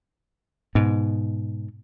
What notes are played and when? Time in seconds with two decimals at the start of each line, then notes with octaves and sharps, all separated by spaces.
0.75 G#2 B2